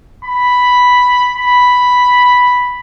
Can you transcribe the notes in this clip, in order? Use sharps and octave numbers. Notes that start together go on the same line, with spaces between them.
B5
B5